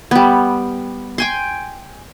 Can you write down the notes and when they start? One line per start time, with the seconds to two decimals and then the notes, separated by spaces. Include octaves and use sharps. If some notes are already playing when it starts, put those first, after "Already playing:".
0.11 G3 B3
1.18 G5 G#5 C6